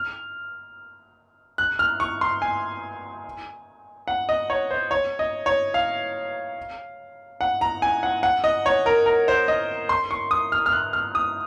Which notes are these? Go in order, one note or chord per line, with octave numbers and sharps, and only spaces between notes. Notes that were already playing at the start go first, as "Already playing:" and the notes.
Already playing: F6
F#6
F6
C#6
C6
G#5
F#5
D#5
C#5
C5
C#5
D#5
C#5
F5
F#5
A#5
G#5
F#5
F#5
D#5
C#5
A#4
A#4
C5
D#5
C6
C#6
D#6
F6
F6
F#6
F6
D#6